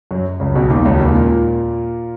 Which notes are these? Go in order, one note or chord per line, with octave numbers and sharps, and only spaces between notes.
F#2 F#3
C#2 C#3
B1 B2
D#2 D#3
C#2 C#3
D#2 D#3
A#2 A#3